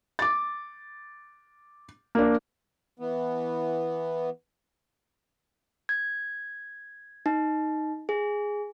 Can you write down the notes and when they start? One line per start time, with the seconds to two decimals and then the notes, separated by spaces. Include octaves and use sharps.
0.19 D6 A6
2.15 A#3 D4
2.99 E3 B3
5.89 G#6
7.26 D#4
8.09 G#4